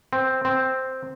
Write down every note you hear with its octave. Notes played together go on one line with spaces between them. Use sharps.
C4
C4